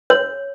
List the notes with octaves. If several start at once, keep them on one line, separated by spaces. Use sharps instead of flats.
C#5